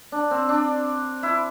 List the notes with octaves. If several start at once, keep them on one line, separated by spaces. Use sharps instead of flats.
D4
C4
D4
E4